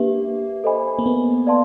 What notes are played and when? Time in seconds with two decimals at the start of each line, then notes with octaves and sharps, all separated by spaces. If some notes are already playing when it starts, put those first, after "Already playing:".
Already playing: A#3 D4 G4 B4 E5
0.64 A4 C5 D#5 G#5 B5
0.99 A#3
1.06 B3
1.47 B4 D5 F5 A5 C6